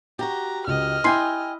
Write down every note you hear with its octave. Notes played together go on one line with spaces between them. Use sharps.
F#4 G4 A#5
C#2 D#5 F6
E4 G5 G#5 C6 C7